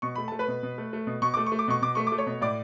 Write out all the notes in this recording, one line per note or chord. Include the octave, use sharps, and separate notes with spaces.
B2 C#6
A3 B5
A3 A5
B4 B5
B2
B2
A3
A3
B2
B2 C#6
A3 D6
C#6
A3
D6
B2 C#6
B2 D6
A3 C#6
D6
A3
C#5 C#6
B2
A2 D5 D6